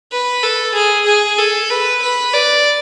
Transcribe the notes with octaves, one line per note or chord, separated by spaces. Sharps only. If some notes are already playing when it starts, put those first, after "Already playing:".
B4
A4
G#4
G#4
A4
B4
B4
D5